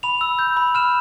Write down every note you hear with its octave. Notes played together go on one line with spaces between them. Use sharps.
B5 F7
E6
G6
B5
F6 E7